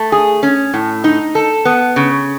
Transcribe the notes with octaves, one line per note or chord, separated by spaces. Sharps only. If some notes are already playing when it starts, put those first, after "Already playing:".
Already playing: A3
G#4
C#4
A2
D#4
A4
B3
C#3